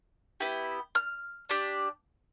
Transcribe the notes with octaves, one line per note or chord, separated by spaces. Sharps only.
B3 E4 G4
F6
D4 G4